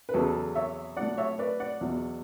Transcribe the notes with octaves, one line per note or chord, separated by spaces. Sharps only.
B4
E2 C#3 F#3 F#4 A4
C#5 E5
A2 F#3 D5 F#5
C#5 E5
B4 D5
D5 F#5
E2 B2 F#3